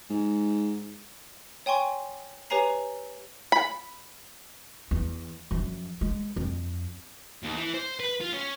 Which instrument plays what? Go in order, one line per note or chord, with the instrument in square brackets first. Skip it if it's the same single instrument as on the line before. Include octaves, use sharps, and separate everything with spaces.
[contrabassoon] G#2
[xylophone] C#5 G5 G#5 C6 C#6
G4 B4 C#5 G#5 A#5 C7
[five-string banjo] B5
[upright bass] E2
F#2 F3
G#3
F2
[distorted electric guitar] D#2
E3
C5
B4
F4
C#4